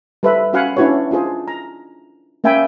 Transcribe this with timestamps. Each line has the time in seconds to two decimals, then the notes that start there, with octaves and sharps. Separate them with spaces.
0.23 G3 A4 B4 C5 E5 B5
0.53 C#4 F#4 F5 F#5 G#5 B5
0.77 C#4 D4 E4 F#4 B4 C#5
1.11 D4 F4 G#4 C5
1.48 A#5
2.44 A#3 C#4 E5 G5 G#5 B5